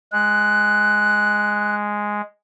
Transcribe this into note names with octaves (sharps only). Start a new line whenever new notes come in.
G#3 F#6